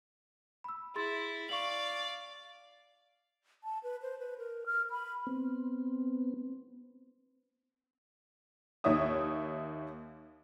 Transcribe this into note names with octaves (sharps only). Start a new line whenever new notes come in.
B5 E6
E4 G#4 C6 A6
D5 F5 C#6 F#7
A5
B4
C5
B4
A#4
F6
B5
B3 C4
D#2 D#4 C#5 E5 D#6